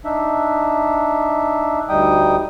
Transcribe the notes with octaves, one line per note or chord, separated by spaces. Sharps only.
D4 D#4 E5
D2 G3 D#4 G5 D#6